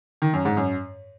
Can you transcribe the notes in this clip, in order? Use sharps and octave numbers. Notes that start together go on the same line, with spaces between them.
D#3
F#2
G#2
F#2